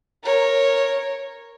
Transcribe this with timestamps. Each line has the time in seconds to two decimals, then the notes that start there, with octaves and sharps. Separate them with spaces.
0.23 A#4 C#5